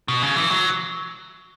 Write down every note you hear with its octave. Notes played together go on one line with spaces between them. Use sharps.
B2
C#3
E3
F#3